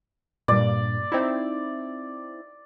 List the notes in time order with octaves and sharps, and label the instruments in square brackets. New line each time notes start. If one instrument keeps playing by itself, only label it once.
[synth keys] G2 A#2 [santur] D5
[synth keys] C4 D#4 E4